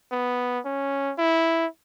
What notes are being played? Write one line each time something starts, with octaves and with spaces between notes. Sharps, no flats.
B3
C#4
E4